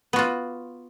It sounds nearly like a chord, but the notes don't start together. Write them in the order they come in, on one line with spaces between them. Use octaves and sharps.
B3 F#4 F4